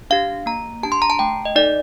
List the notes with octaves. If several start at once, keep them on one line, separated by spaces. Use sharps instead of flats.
D4 G4 F5
A#3 A#5
D4 G4 A5
C6
A#5
A5
A3 G5
D#5
D#4 A4 D5